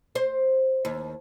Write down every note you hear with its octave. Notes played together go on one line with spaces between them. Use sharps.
C5
D#2